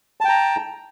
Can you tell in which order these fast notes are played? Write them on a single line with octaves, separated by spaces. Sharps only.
A5 G5 A#5